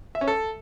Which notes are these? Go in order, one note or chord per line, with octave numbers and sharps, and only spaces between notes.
E5
C#4
A4